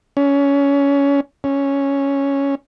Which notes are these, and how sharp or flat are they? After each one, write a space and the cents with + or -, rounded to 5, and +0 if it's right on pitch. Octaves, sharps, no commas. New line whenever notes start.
C#4 +20
C#4 +0